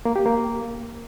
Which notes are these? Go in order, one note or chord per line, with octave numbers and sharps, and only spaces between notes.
A#3
G4
A#3